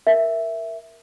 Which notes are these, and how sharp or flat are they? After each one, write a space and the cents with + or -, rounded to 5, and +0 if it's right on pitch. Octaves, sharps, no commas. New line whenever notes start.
A#4 +0 E5 +0